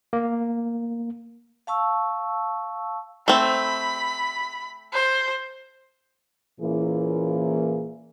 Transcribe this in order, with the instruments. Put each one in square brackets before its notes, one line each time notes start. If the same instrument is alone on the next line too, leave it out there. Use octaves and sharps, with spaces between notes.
[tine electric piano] A#3
[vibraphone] F5 A5 C#6 E6
[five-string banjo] A3 C4 [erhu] B5
[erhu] C5
[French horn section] A#2 E3 A#3 C#4 E4 G#4